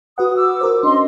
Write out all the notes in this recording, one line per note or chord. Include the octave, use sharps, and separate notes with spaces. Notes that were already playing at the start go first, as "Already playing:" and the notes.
F#4 B4 F#5 D#6
D6 E6
F#4 A#4 C5
C#4 D4 D#5 C6